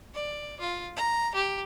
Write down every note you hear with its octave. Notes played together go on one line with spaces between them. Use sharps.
D5
F4
A#5
G4